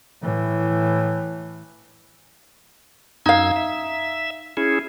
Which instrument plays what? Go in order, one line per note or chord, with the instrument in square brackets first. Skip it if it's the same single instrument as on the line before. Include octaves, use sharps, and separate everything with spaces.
[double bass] A2 E3
[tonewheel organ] F#2 E6 G#6 [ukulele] D#4 F5
[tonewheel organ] E5
C#4 E4 G#4